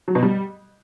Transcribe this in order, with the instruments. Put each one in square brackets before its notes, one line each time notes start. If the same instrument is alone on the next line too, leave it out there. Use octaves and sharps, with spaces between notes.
[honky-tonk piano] F#3
B2
G3